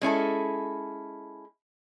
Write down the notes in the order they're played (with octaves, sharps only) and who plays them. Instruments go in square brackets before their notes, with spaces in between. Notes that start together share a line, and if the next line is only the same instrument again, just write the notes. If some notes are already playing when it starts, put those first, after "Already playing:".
[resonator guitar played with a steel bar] G#3 C#4 E4 A4